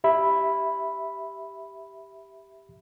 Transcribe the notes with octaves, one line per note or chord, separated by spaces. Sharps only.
G4 E5 B5